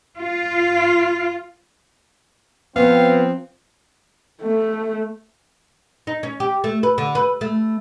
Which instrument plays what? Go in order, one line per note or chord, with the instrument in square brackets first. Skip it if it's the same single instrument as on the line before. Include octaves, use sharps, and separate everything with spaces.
[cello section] F4
[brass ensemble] F3 C4 [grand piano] B3 [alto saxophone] F5
[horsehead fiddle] A3
[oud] D#4
C#4
G4
A3
B4
D3
B4
A3